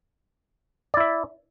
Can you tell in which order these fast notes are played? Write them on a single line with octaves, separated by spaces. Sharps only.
D5 E4 E5